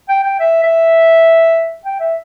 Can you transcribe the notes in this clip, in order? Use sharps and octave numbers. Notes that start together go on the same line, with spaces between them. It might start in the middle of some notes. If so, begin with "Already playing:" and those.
G5
G5
E5
E5
G5
E5